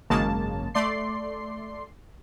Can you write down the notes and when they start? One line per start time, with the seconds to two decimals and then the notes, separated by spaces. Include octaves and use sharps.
0.10 G#1 F#2 C#3 G#3 A#3 A5
0.75 A3 D5 C6 C7